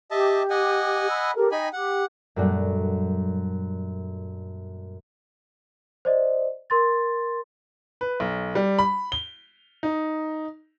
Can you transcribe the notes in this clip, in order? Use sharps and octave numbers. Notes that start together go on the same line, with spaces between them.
G4 D#5 E5 A5
D#5 F#5 G#5
B5 E6
G4 A4 A#4
D#4 D#5 G5 G#5 B5
G4 F#5
F#2 A#2 G3 A3 D4 F#4
C5 D5 D#5
A#4 C6 A6
B4
B1
G3
B5
G7
D#4